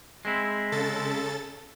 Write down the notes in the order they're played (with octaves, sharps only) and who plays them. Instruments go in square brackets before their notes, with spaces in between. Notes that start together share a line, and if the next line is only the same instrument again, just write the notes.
[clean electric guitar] G#3 C4 E4
[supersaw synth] C#3 A4 A6